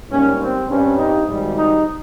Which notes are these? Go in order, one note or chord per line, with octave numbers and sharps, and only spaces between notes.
G#2 G3 A#3 C#4
C4
G2 G3 C4 C#4
D#4
G#1 G#2 G3
D#4